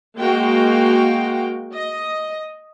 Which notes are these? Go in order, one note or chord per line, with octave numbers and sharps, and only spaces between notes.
G#3 A#3 F#4 F5 G5
D#5